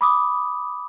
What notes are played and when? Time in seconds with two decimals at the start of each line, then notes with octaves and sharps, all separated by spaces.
0.01 B5 D6 D#6